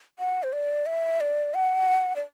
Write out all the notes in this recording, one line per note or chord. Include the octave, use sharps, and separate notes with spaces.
F#5
C5
D5
E5
D5
F#5
D5